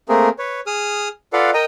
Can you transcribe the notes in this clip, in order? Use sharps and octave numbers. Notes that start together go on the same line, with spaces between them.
A3 A#3 C4 G#4 A#4
B4 C#5
G#4 D#6 F6
F4 A4 B4 D5 F5 F#5
A#4 D#5 G5 A#5